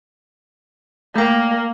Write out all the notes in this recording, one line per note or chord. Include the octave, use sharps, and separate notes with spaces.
A3 A#3 G5